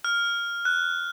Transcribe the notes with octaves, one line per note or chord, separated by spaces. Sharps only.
F6
F#6